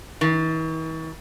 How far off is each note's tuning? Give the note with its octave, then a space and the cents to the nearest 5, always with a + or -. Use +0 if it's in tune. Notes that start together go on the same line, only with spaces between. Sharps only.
E3 -45